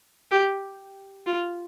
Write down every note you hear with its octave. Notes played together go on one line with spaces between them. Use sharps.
G4
F4